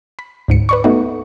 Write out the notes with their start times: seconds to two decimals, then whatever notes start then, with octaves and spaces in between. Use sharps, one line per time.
0.19 B5
0.48 D2 G#2 C#7
0.69 B4 D5 C#6
0.84 A3 B3 D#4 F#4